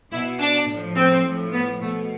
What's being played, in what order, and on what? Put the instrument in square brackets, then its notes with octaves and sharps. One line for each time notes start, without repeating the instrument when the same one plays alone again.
[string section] B2 E4
D4
A2 F3
C4
A2 F3
B3
B2 A3